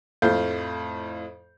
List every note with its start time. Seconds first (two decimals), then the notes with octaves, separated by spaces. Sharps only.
0.22 F2 A2 A3 F5 G6